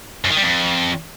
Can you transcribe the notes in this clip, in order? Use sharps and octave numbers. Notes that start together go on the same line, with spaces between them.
F#2
D#3
G3
F2